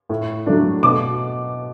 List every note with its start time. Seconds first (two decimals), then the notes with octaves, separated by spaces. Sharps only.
0.09 A2
0.46 F#3 A3 D4
0.83 B2 D6